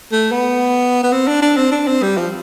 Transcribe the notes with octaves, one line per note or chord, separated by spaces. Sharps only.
A3
B3
B3
C4
D4
D4
C4
D4
C4
G3
F3